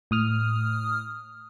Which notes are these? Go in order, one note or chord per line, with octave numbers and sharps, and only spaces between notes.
A2 D#6 F6